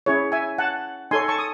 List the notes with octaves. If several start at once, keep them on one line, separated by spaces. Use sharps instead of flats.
C#4 E4 G#4 C#5
E5 G#5
F#5 A5
D#4 A4 C#5 G#5 C6
A5 C#6
D#6